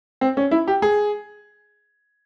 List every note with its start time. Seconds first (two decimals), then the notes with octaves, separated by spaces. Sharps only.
0.21 C4
0.37 C#4
0.51 E4
0.67 G4
0.82 G#4